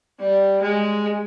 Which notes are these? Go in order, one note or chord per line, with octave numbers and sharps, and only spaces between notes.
G3
G#3